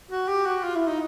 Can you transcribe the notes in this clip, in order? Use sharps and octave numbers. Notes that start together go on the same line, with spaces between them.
F#4
G4
F#4
F4
E4
D#4